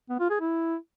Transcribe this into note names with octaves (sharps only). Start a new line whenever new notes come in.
B3
F4
G#4
E4